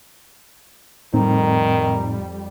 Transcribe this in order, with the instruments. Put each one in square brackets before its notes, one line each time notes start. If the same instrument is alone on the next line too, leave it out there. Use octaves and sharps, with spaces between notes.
[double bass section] F2 G3 [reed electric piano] A2 C4 D#4 [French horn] D#3 [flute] A#5